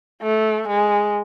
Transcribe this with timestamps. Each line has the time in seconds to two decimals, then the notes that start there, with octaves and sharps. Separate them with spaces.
0.22 A3
0.68 G#3